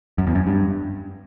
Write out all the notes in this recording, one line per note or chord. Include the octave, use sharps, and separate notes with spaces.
F#2
E2
F#2
G2